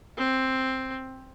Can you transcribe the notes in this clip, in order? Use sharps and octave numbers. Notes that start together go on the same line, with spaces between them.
C4